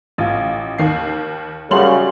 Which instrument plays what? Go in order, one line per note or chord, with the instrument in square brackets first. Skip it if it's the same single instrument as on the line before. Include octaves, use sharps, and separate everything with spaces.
[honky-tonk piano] A1 F4
D#2 D#3 C7
[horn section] F#2 C#3 [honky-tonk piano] G3 C6 F#7